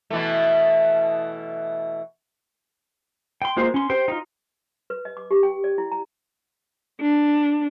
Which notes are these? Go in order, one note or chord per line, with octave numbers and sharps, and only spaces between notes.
B2 E3 A3
G5 C6
G#3 A#3 F4 C5
C#4 C6
G4 C5 G5
D#4 F4
B4
D#5
D6
G4
G5
D5
E4
A#5
D4